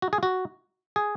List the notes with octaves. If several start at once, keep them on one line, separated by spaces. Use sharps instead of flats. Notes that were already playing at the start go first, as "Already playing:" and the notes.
F#4
G#4
F#4
G#4